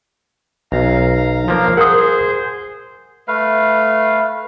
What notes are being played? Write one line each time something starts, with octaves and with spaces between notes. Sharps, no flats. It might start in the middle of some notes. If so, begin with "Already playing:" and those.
B1 F5 A#5
F3 A#3
G#4 A#4 C5 F#5 D#6
A3 B4 F5